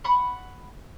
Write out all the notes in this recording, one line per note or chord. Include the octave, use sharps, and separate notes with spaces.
F#5 B5 C#6